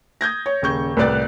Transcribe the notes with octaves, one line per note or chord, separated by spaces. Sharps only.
D#6 G6 G#6 A#6
C#5
D#1 C#3 C#6 G6
C2 A2 B4 D5 F#6 A6